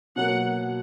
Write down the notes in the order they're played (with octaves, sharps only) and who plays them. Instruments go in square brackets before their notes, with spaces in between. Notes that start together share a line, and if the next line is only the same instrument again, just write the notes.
[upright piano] B2 F#3 A#3 [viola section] F#5